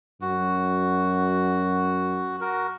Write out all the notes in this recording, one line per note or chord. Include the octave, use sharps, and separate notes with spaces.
F#2 F#4
F#4 A#4